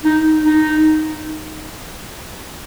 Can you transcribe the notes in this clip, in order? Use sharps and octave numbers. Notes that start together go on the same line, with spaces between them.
D#4
D#4